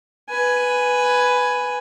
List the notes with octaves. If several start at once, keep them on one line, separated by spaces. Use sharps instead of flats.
B4 G#5